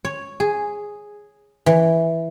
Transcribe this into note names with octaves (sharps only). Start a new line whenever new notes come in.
C#5
G#4
E3